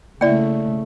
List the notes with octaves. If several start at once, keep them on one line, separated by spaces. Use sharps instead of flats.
C#3 A3 A#3 E4 D5 E5 G5